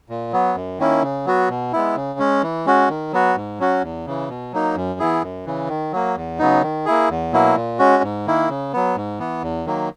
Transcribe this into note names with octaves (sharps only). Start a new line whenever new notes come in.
A#2
F#3 B3
F#2
D#3 A#3 C#4 E4
C#3
F#3 B3 F#4
B2
G#3 B3 E4
C#3
G#3 C#4
E3
G#3 C#4 F#4
D#3
F#3 B3 F#4
G#2
F#3 C#4 F#4
E2
C#3 E3
B2
F#3 A#3 D#4
F#2
E3 B3 E4 G#4
F#2
C#3 E3
D#3
F#3 A#3
E2
C#3 F#3 B3 D#4
D#3
A#3 E4 G#4
E2
B2 F#3 A#3 E4
A#2
G#3 C#4 F#4
G#2
D#3 A#3 E4
C#3
F#3 B3
G#2
E3 B3
E2
D#3 F#3 A#3